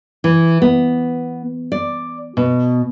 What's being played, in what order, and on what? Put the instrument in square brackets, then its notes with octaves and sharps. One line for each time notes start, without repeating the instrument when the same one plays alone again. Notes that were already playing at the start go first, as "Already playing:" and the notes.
[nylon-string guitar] E3
B3
D5
B2